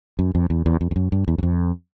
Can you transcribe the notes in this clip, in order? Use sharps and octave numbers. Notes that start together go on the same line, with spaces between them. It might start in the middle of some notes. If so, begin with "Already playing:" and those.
F#2
F2
E2
E2
F2
F2
F#2
G2
E2
F#2
F2